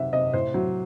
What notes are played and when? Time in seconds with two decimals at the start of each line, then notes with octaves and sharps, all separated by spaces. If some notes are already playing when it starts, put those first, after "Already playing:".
Already playing: C3 D#3 F#3 E5 F#5
0.13 C3 D#5
0.33 A2 C5
0.54 F#3